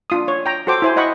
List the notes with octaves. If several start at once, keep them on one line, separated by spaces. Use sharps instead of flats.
D4 F4 D#6
C#5
G5 A#5
F#4 A4 C5 G5 D6
E4 C5 G#5
C5 D#5 F#5 B5 C#6